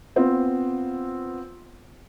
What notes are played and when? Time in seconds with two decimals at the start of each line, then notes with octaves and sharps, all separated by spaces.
0.16 B3 C4 F4